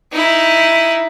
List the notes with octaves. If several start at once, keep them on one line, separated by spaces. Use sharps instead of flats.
D#4 E4